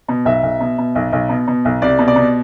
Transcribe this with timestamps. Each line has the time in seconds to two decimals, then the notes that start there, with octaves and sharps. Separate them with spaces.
0.08 B2
0.25 B1 E5
0.43 B1
0.60 B2
0.78 B2
0.95 B1
1.12 B1
1.29 B2
1.47 B2
1.65 B1
1.82 C2 D5
1.99 B2
2.08 D5
2.16 B2